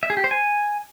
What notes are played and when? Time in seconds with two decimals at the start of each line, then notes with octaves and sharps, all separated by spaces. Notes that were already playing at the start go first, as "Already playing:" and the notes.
0.03 E5
0.10 G#4
0.17 G4
0.24 C5
0.31 G#5